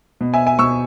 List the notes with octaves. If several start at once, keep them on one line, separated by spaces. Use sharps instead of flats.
B2
E5 G#5
E5 G#5
B2 C#6 E6